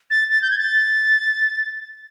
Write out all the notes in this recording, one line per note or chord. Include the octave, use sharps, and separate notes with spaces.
A6
A6
G6
G#6
A6